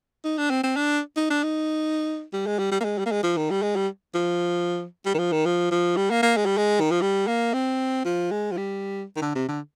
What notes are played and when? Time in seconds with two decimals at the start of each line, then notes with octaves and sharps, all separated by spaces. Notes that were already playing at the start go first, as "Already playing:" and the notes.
0.24 D#4
0.38 D4
0.50 C4
0.64 C4
0.77 D4
1.17 D#4
1.30 D4
1.43 D#4
2.33 G3
2.47 G#3
2.59 G3
2.72 G3
2.81 A#3
2.84 G#3
2.98 G3
3.06 A#3
3.12 G#3
3.23 F3
3.37 D#3
3.51 G3
3.62 G#3
3.76 G3
4.15 F3
5.06 G3
5.15 D#3
5.19 F3
5.32 D#3
5.46 F3
5.71 F3
5.97 G3
6.11 A#3
6.23 A#3
6.37 G#3
6.46 G3
6.58 G#3
6.80 D#3
6.92 F3
7.02 G3
7.27 A#3
7.54 C4
8.05 F3
8.31 G#3
8.52 F3
8.57 G3
9.17 D#3
9.22 D3
9.35 C3
9.48 D3